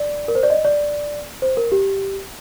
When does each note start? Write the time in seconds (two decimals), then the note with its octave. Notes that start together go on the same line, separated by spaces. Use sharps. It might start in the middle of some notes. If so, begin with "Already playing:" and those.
Already playing: D5
0.28 A#4
0.35 C5
0.43 D5
0.50 D#5
0.65 D5
1.42 C5
1.57 A#4
1.72 G4